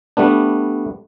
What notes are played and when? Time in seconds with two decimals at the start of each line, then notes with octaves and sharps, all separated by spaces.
0.17 G3 A3 B3 D4